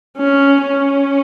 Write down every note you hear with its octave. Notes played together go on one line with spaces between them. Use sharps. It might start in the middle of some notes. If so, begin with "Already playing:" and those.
C#4
C#4